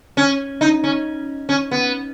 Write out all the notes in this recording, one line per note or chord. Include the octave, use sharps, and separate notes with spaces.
C#4
D#4
C#4
C#4
B3